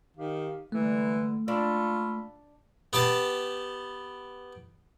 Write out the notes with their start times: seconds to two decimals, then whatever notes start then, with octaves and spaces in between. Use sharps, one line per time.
0.17 D#3 G4 F5
0.72 D3 E3 G3 A3
1.48 D4 F4 B5 C#6 E6
2.93 B3 G4 G5 A5